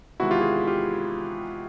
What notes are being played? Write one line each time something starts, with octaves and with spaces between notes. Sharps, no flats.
E2 C3 D#3 G#3 E4 F#4
F4 G4
F#4 G#4
F4 G4